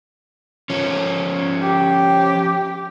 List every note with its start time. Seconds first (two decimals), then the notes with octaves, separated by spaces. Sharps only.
0.70 F3 C#4
1.62 G4